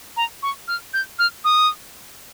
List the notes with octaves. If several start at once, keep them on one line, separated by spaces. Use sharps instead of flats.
A#5
C#6
F6
G6
F6
D#6